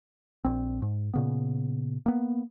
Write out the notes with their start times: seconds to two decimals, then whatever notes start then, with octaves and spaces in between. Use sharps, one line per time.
0.45 A#1 C4
0.82 G#2
1.14 A#2 C#3 B3
2.06 A#3 B3